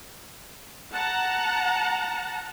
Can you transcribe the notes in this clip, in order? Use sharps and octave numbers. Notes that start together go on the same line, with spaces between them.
F#5 A5 A#5